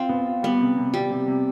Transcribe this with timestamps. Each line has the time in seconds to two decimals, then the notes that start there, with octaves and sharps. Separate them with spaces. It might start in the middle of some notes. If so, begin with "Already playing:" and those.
Already playing: C4 F4
0.09 B3
0.27 F4
0.43 G3 B3
0.61 C3
0.77 C3
0.94 C3 G3
1.10 C3
1.28 C3